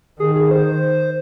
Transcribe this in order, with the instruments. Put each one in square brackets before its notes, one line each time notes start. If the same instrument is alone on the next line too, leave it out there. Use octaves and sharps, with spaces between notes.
[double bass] D#3 [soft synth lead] G#4
[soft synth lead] G#4
C5